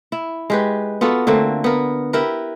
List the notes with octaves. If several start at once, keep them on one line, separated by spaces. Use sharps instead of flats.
E4
G#3 G4 B4
B3 F4 F#4 A4
D3 A3 A#3 C4
B3 A#4
E4 G4 A#4 B4